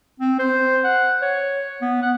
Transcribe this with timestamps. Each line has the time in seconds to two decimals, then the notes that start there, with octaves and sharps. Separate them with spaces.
0.20 C4
0.39 C5
0.84 F#5
1.22 C#5
1.81 B3
2.02 F#5